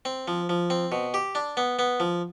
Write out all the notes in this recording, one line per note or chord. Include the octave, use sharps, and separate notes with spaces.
C4
F3
F3
C4
B2
G4
D4
B3
B3
F3